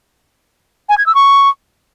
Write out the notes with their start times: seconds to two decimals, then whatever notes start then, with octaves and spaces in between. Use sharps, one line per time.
0.89 G#5
0.98 G#6
1.06 E6
1.15 C#6